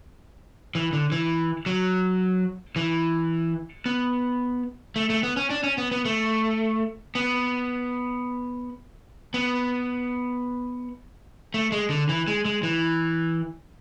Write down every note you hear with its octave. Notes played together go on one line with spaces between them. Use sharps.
E3
D3
E3
F#3
E3
B3
A3
A3
B3
C#4
D4
C#4
B3
B3
A3
B3
B3
A3
G#3
D3
E3
G#3
G#3
E3